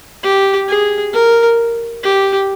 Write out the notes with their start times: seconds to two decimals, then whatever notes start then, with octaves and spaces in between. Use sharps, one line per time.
0.24 G4
0.68 G#4
1.14 A#4
2.04 G4